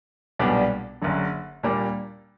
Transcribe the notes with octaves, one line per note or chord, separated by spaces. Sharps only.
B1 A#2 G3 B3 D4
F#1 F#2 D3
A#2 G3 A#3 D4